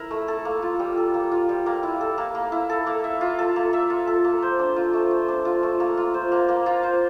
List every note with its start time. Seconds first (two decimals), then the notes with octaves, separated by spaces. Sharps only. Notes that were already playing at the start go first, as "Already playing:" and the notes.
Already playing: E4 A#4
0.11 A3
0.28 A4
0.45 A#3
0.62 F4
0.79 G3
0.97 A4
1.14 A#3
1.31 F4
1.49 G3
1.66 A#3
1.83 E4
2.01 A4
2.18 A#3
2.35 A#3
2.52 E4
2.70 A4
2.87 A#3
3.04 E5
3.21 F4
3.39 A4
3.56 A#3
3.73 E5
3.90 F4
4.07 A4
4.25 A#3
4.42 C5
4.59 D4
4.76 F4
4.94 A3
5.11 C5
5.28 D4
5.45 F4
5.63 A3
5.80 A#3
5.97 F4
6.14 C5
6.32 A#3
6.49 A#3
6.66 F4
6.83 C5